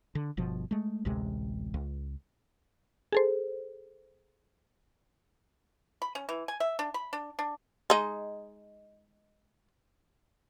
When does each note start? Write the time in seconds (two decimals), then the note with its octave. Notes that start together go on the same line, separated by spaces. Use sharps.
0.15 D3
0.37 G1 B2 F3
0.71 G#3 A3
1.05 A1 D2 C3 G#3
1.74 C#2
3.12 G#4 A4 C5
6.02 B5
6.15 C#4
6.29 E3
6.48 G#5
6.60 E5
6.79 D4
6.94 B5
7.13 D4
7.39 D4
7.90 G#3 D#4